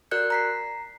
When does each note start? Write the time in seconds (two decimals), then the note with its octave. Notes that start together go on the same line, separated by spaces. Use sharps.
0.11 F#4 A#4 D5 F#6 G6 C#7
0.30 A#5 B6 C7